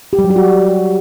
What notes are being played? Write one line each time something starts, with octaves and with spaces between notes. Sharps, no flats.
G4
G3
F#3
G4
F#4